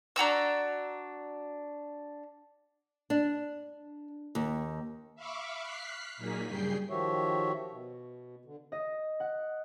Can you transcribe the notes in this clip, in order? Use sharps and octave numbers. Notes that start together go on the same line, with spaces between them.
D4 F#4 A#5 E6
D4
D#2
E5 F5 B5 C#6 D6
F6 F#6 B6 C7
A#2 F#3 A#3 D#4 G#4 B6
G2 C#3 G3 G#4 G5 C7
D#3 F3 F#4 G4 C#5 E5
B2
D3
D#5
F#5